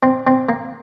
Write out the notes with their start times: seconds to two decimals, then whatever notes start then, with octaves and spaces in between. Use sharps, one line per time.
0.03 C4
0.27 C4
0.49 A#3